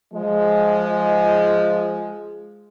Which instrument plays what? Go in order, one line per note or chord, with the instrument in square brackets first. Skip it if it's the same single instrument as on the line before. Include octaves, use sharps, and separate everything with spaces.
[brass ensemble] F3 G#3